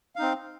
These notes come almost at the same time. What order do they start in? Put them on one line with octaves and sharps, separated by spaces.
F5 D#4 C4